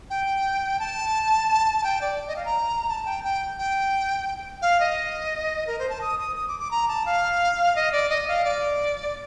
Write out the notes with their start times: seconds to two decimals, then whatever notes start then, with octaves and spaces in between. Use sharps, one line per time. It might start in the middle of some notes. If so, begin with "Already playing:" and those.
0.10 G5
0.79 A5
1.78 A5
1.84 G5
2.01 D5
2.28 D#5
2.36 F5
2.45 A#5
2.89 A5
3.05 G5
3.24 G5
3.59 G5
4.62 F5
4.80 D#5
5.67 A#4
5.79 C5
5.89 A5
6.01 D#6
6.19 D#6
6.36 D#6
6.48 D6
6.59 D6
6.71 A#5
6.88 A5
7.06 F5
7.76 D#5
7.92 D5
8.09 D#5
8.28 F5
8.45 D5